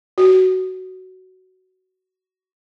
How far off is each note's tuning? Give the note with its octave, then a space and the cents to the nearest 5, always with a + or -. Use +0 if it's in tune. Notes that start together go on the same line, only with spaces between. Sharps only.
F#4 +10